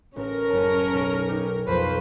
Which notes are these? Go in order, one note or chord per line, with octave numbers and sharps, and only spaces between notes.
A1 C#4 A#4
F#1 A5
B1
D#4 G4 D6
B1 F2 B4 C5